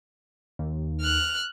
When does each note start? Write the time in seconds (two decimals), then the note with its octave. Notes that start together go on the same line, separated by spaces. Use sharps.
0.59 D#2
1.00 F6 F#6